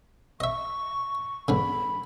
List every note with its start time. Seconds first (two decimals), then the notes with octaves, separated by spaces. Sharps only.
0.40 D#5 E5 C#6
1.48 E2 G2 D3 B5